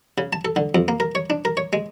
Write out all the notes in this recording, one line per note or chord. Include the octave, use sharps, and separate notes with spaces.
C#3
A5
A4
D3
F2
A#3
A#4
C#5
D4
A#4
C#5
G#3